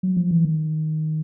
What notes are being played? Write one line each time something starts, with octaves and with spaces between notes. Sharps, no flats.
F#3
F3
E3
D#3